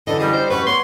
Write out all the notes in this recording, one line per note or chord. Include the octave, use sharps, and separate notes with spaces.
F#2 D3 E3 A4 D#5
G3 G#4 D#5
C5
F#2 F#4 B4 C#6
B3 C#5 C6